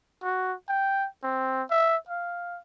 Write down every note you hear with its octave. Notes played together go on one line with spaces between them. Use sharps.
F#4
G5
C4
E5
F5